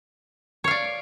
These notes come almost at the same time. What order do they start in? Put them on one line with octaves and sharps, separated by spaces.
C#5 F5 D5